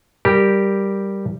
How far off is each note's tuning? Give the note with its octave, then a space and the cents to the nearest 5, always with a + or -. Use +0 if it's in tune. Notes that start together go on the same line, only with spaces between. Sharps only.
G3 +0 G4 +0 A#4 +0